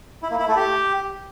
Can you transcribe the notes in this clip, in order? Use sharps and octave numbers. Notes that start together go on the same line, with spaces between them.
E4
A#3
E4
A3
G4